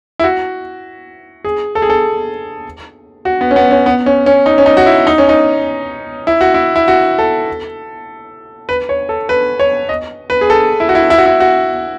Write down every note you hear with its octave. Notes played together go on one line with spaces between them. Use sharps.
E4
F#4
G#4
A4
G#4
A4
F#4
B3
C#4
B3
C#4
B3
C#4
C#4
D#4
C#4
D#4
F#4
E4
D#4
C#4
D#4
E4
F#4
E4
E4
F#4
A4
B4
C#5
A4
B4
C#5
D#5
B4
G#4
A4
E4
F#4
E4
E4
F#4
E4
F#4